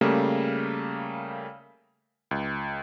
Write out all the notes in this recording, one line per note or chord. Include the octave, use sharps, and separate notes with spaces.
C#3 G3 A3 A#3
C#2